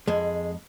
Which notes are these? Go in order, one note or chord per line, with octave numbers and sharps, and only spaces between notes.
F2 G#3